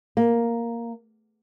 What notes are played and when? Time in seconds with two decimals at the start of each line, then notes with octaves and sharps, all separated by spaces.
0.17 A#3